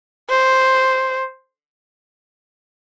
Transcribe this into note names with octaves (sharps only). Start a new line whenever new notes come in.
C5